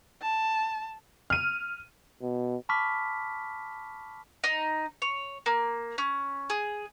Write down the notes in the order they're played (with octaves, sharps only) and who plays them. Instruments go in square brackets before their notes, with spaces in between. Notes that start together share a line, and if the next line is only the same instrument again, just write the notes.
[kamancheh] A5
[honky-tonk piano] F6 D#7
[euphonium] B2
[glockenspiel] A5 B5 C#6 D6 F6 B6
[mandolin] D#4
C#5
A#3
C#4
G#4